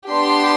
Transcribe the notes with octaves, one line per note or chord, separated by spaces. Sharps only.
B3 D4 G4 C6